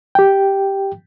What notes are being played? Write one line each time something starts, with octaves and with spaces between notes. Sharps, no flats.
G4 G5